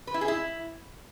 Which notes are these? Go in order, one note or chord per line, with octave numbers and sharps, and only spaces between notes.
B4
E4
G#4
E4